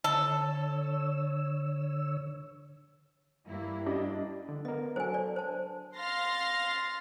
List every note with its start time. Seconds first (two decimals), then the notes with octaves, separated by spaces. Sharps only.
0.04 D3 A4 C#5 E6
3.46 G2 A#3 E4
3.86 G3 D4 D#5
4.49 D3
4.65 B3 A#4 D#5
4.96 F#3 D4 A4 C5 G#5
5.14 D5
5.36 C5 A5
5.97 F5 C6 F6 A6 A#6 C7